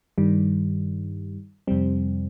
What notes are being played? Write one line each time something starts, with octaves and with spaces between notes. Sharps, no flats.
G2 D#3 G3
F2 C3 G3 C4